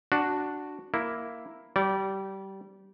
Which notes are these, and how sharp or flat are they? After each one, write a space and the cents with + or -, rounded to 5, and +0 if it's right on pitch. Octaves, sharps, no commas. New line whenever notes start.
D4 +0 F#4 +0
A#3 +0 E4 +0
G3 -20 D5 -30